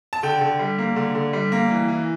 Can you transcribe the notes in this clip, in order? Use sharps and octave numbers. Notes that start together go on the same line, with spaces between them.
A5
D3 G5
D3
G3
A#3
D3
D3
G3
A#3
E3
E3